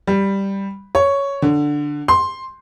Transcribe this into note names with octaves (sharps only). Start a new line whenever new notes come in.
G3
C#5
D3
C6